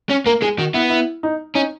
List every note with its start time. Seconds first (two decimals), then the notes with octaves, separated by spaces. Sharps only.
0.10 C#4
0.26 A#3 A#4
0.42 G#3 G#4
0.58 D#3 F#4
0.74 B3 E4
0.90 E4
1.23 D#4
1.55 C#4 D#4